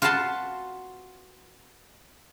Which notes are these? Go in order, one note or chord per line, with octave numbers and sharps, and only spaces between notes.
F4 F#4 B4 F#5 A5 C6